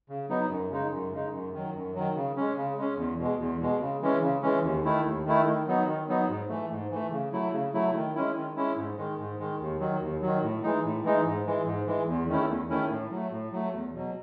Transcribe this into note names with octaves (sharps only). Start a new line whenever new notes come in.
C#3
F#3 B3 D#4
F#2
C#3 G#3 D#4
F#2
C#3 G#3 D#4
F#2
D#3 F#3
F#2
D#3 F#3
C#3
G#3 C#4
C#3
G#3 C#4
E2
B2 G#3
E2
B2 G#3
C#3
E3 G#3 C#4
C#3
E3 G#3 C#4
D#2
D#3 A3 E4
D#2
D#3 A3 E4
D#3
F#3 B3 D#4
D#3
F#3 B3 D#4
G#2
E3 A3
G#2
E3 A3
C#3
F#3 A3 E4
C#3
F#3 A3 E4
D#3
G#3 C#4 E4
D#3
G#3 C#4 E4
G#2
D#3 G#3
G#2
D#3 G#3
D#2
D#3 F#3
D#2
D#3 F#3
A2
E3 G#3 D#4
A2
E3 G#3 D#4
G#2
E3 G#3
G#2
E3 G#3
E2
D#3 A3 C#4 E4
E2
D#3 A3 C#4 E4
A2
F#3
A3
A2
F#3 A3
E2
B2 F#3